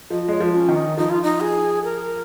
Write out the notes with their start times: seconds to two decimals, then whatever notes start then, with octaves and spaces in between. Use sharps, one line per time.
0.10 F3 D#5
0.28 G#3 C#5
0.40 F3
0.55 C#4
0.68 D#3
0.76 D#4
0.97 F3 D#4
1.10 F4
1.23 D#4
1.40 G#4
1.84 A#4